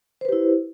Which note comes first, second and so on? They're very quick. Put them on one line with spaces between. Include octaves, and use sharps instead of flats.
C5 B4 G4 E4